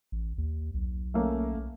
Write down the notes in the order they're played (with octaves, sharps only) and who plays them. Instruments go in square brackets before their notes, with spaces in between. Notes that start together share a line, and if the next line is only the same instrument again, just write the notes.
[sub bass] A1
D#2
B1
[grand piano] A3 A#3 C#4